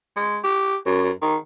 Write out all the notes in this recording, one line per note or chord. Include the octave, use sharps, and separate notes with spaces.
G#3
G4
F#2
D#3